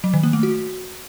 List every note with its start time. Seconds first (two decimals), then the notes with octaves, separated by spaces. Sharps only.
0.04 F#3
0.14 D#3
0.23 A#3
0.33 A3
0.43 F#4